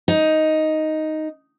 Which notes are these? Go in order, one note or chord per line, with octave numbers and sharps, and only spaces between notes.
D#4